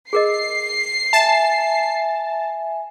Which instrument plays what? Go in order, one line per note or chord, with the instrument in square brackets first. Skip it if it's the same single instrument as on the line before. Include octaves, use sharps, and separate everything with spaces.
[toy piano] G#4 A#4 D#5 [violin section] C7
[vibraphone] E5 G#5 [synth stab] A5